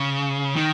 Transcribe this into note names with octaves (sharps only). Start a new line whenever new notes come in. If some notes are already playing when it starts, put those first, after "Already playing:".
Already playing: C#3
D#3